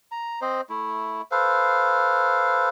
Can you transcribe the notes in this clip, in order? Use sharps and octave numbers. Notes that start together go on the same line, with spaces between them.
A#5
C4 C5 D#5
A3 E4
A4 B4 C5 F5